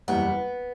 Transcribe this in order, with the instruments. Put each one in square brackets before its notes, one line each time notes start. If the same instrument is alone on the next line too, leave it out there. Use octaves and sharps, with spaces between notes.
[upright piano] F#1 E2 B2 G3 A#3 [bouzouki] B3